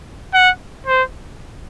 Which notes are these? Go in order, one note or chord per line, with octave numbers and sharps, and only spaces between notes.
F#5
C5